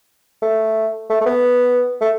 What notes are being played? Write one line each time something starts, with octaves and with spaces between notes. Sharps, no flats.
A3
A3
A3
B3
A3